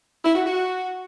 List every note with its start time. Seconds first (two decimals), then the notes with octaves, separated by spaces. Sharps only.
0.24 E4
0.35 F#4
0.46 F#4